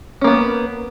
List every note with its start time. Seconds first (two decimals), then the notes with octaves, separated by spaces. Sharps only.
0.21 C#4
0.24 A#3
0.27 B3